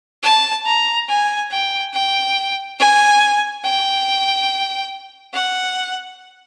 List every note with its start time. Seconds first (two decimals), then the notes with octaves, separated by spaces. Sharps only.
0.23 A5
0.66 A#5
1.09 G#5
1.51 G5
1.93 G5
2.79 G#5
3.64 G5
5.34 F#5